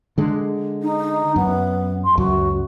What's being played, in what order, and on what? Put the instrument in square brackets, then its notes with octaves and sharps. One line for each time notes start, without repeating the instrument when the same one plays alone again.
[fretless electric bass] D3 G#3
[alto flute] D#4
[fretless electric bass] F#2 [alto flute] B3
[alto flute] C6
[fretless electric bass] C#2 F#2 [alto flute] F#4